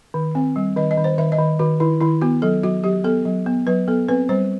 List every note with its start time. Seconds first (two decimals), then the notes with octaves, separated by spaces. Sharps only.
0.14 D#3
0.35 C4
0.56 G3
0.76 D#3 D#5
0.91 D#5
0.97 D#3
1.04 C5
1.18 D#3 E5
1.32 D#5
1.39 D#3
1.59 D#3 F#4
1.80 D#3 E4
2.01 D#3 E4
2.22 B3 F#4
2.42 F#3 A4
2.63 F#3 F#4
2.84 F#3 G4
3.04 B3 A4
3.25 F#3
3.46 B3
3.67 F#3 B4
3.88 B3 A4
4.08 C4 B4
4.29 G3 C5